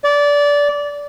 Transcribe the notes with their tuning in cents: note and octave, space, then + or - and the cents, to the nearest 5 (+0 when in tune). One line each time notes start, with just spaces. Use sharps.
D5 -20